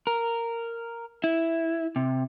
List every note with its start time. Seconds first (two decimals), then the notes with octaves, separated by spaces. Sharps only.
0.07 A#4
1.24 E4
1.96 C3